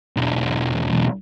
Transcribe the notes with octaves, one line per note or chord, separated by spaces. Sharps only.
B1 E2